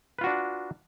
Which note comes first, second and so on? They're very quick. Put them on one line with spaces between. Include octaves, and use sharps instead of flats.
B4 F4 F#4 D4